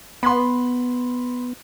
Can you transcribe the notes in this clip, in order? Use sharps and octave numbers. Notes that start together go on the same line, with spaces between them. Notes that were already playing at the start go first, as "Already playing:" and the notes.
B3 B5 C6